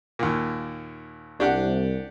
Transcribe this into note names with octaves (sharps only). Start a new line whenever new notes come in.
D#2 A#2
C2 D4 G4 F#5